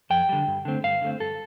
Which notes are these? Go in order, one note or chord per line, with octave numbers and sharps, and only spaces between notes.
F2 G5
D3 G3
G2
D3 A3 C4
G2 F5
D3 A3 C4
G2 A4